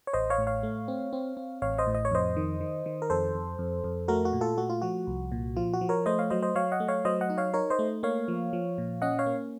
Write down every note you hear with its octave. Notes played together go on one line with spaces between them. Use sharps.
C#5
A1 C5 D#5
C#5 F5
A2
C#5 F5
A3
C4
C4
C4
A1 C#5 F5
C5 D#5
A2
D#5
C#5
F2 C5 D#5
D#3
D#3
D#3
A#4
F2 A4 C5
F2
F2
F2
A3 F#4 A#4
F#4
A#2
F4 A4
A3 F#4
F4
F3 F#4
C2
A#2
F3 F4
F#4
F3
A#4 C#5
A3 C5 D#5
C#5 F5
F#3 C5 D#5
C5 D#5
F#3 C#5 F5
D#5 F#5
A3
C#5 F5
F#3 C5 D#5
D#5 F#5
D#4
C#5 F5
D#4 A#4 C#5
C5 D#5
A3
A#3 C#5 F5
F3
F3
A#2
C#4 D#5 F#5
C#5 F5
A#3